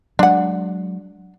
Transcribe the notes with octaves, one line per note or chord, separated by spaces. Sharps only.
F#3 G#3 D4 F#5